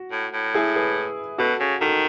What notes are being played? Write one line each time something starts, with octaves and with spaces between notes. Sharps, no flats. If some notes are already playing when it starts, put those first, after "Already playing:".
Already playing: F#4
A2
A2
E4 G#4
G#4 B4
B2 F#4 A4
C#3
D#3 F#4 A4